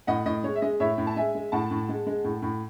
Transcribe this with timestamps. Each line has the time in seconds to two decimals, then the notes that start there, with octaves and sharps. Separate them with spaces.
0.07 A2 D#5 F#5
0.26 A2 D#5
0.44 G#3 C#5
0.55 E5
0.62 G#3 D#5
0.80 A2 C#5 E5
0.98 A2
1.07 A5
1.17 G#3 E5 G#5
1.35 G#3
1.52 A2 F#5 A5
1.71 A2
1.89 G#3
2.07 G#3
2.24 A2
2.42 A2